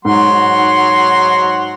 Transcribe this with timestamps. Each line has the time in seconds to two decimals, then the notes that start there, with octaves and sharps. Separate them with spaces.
0.05 G#2 F#3 F#5 C6